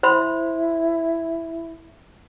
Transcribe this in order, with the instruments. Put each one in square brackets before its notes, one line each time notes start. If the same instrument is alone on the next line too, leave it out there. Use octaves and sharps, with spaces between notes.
[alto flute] E4 [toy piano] C5 B5 C6